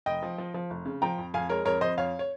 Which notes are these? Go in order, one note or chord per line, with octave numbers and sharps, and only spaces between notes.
F1 D#5 G5
F3
F3
F3
F1
C#3
F3 G5 A#5
F2
F2 F5 G#5
G#3 A#4 C#5
F2 A#4 C#5
F2 C5 D#5
F2 C#5 F5
C#5